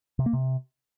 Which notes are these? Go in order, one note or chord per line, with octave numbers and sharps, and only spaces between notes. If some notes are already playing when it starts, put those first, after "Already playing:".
C3
A#3
C3